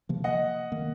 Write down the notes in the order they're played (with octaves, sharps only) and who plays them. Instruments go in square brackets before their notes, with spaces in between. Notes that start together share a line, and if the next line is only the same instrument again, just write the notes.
[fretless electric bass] C3 F3 A#3
[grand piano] D#5 F#5
[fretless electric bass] D#3 A#3